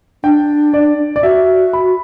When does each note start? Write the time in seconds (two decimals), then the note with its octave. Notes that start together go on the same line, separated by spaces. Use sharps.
0.23 D4 G5
0.74 D5
1.16 D5
1.23 F#4 E5
1.73 B5